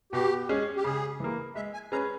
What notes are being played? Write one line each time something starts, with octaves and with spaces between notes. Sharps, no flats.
B2 G4
G#3 C#4 G#4
G4
C#3 G#4
E3 A#3
G#3 E5
G#5
C#4 G#4 B4 A#5